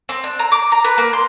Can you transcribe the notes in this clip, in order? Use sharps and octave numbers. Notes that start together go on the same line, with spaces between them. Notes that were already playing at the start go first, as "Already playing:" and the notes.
C4
D4
A#5
D6
A#5
B4
A#3
C6